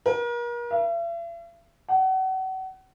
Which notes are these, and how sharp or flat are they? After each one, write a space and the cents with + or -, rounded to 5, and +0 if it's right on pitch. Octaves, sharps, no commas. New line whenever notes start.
A#4 +40
E5 +45
F#5 +35